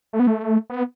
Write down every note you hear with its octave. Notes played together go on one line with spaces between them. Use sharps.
A3
B3
A3
B3